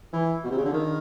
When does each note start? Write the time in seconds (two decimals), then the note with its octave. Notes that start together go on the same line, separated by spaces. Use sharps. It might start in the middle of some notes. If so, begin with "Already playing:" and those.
0.13 E3
0.44 B2
0.51 C3
0.58 C#3
0.65 D3
0.73 D#3